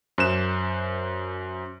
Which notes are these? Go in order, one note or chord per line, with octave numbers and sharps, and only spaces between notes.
F#2 C5 F#6 E7